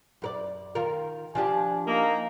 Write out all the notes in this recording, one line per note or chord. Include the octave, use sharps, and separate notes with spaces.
F#2 A#4 D5
D#3 F4 A#4
F3 D4 G4 G#5
A#3 D#4